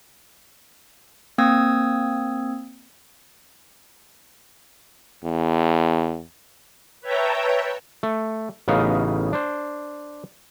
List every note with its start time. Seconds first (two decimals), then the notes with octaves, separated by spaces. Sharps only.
1.38 A#3 C4 D#6 E6 G#6
5.24 E2
7.01 B4 C#5 E5 G5 A5 A#5
8.03 A3
8.68 A1 C#3 B3 D#4 D#5 F5
9.33 D4 C5